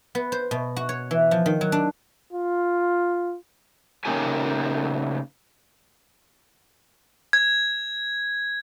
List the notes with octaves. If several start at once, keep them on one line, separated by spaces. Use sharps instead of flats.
B3
C5
B2
F#4
C#5
E3
F3
D#3
F#3
D4
F4
C#3 A#3 D#4 G4 G#5
G#6